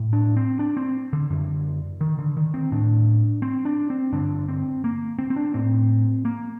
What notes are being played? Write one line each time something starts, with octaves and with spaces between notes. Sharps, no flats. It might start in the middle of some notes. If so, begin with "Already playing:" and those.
Already playing: A2
D4
C4
D4
C4
D3
F#2 D3
D#3
D3
D#3
C4
A2 D4
C4
D4
C4
G2 D3 D4
C4
A#3
C4
C4
D4
A2 C4
A#3